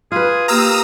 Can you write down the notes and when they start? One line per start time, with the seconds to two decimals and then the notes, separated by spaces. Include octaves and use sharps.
0.12 F4 G#4 B4
0.48 A#3 G4 F5 A#5 D#6 E6